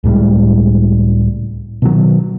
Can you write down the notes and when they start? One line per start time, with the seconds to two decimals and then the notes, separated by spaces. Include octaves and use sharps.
0.04 C#2 A2 G3 G#3
1.82 B2 D#3 F#3